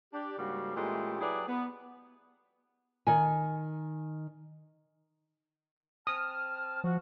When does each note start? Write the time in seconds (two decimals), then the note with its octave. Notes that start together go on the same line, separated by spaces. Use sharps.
0.14 D4 G4
0.38 G#2 C#3 G3 A#3 F#4
0.76 A#2 E3 G#3 A3 C#4 G4
1.21 F#3 E4 G4 G#4 B4 D5
1.48 B3
3.07 D#3 G#5
6.07 C4 A5 D#6 F6
6.84 F3 F#4